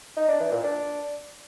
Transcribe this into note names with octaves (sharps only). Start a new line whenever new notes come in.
D#4
D4
E3
A#2
D4